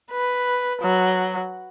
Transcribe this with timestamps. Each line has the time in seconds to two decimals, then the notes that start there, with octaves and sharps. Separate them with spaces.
0.11 B4
0.82 F#3